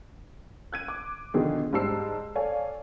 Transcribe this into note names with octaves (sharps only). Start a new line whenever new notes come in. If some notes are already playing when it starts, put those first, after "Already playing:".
F#6 G#6 D#7
D6
B2 D3 D#3 F3 G#4
G#2 G3 C5 A5 E6 C7
A4 C#5 D5 F5 G#5